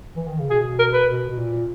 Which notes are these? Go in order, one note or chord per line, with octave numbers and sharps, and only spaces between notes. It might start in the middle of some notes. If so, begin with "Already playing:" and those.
E3
D#3
C#3
B2 G#4
A#4
B4
B2
B2
A#2